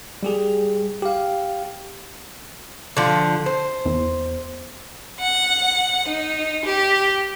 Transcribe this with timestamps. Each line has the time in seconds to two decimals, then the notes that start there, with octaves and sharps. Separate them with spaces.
0.23 G3 G4 G#4
1.02 G4 F5
2.97 D3 F3
3.46 C5
3.85 E2
5.20 F#5
6.08 D#4
6.65 G4